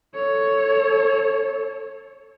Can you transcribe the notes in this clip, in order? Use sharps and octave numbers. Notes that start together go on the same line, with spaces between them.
A4 C#5